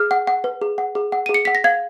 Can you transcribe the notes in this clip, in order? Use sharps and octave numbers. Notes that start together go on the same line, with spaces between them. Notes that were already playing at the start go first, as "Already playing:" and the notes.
Already playing: G#4 F6
F#5
F#5
B4
G#4
F#5
G#4
F#5
G#4 D#7
C#7
F#5 B6
A#6
F5 G#6